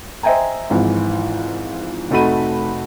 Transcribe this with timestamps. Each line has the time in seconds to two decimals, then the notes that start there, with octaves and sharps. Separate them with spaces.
0.23 C5 D#5 E5 G5 G#5 A#5
0.70 G#1 G#2 E3 F3
2.11 F1 A3 D#4 F#4 B5 D#7